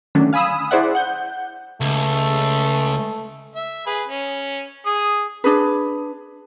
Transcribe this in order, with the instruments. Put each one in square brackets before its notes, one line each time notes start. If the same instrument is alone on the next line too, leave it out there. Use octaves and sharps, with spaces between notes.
[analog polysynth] D3 D#3 F#3 A3 C#4 D4
F5 G#5 B5 D#6 E6
E4 G#4 C5 D5 E5 F#5
F#5 G6
[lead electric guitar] C#2 [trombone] A3
[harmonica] E5
G#4 B4 B5
C#4
G#4 D#6
[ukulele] D4 G#4 B4